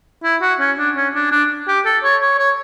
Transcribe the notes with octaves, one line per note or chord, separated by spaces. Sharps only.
E4
F#4
C#4
D4
C#4
D4
D4
G4
A4
C#5
C#5
C#5